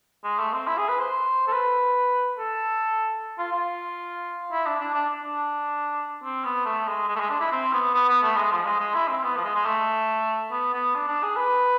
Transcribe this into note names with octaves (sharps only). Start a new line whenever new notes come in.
G#3
A3
C4
E4
G#4
B4
C5
A4
B4
A4
F4
F4
E4
D4
D4
D4
D4
C4
B3
A3
G#3
G#3
A3
G#3
D4
E4
C4
B3
B3
B3
A3
G#3
F3
G#3
G#3
E4
C4
B3
F3
G#3
G#3
A3
B3
B3
D4
D4
G#4
B4